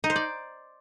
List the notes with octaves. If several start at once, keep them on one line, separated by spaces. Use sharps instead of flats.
D#4
C5
D5